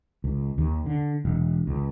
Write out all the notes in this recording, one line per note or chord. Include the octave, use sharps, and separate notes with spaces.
C#2
D#2
D3
E1
C#2